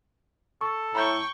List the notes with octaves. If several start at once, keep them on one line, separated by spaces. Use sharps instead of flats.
A4 C#6
A2 G5 A#5 B5 C#6 G6